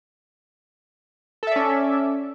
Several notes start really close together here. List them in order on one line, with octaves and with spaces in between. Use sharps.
A4 E5 D5 C#4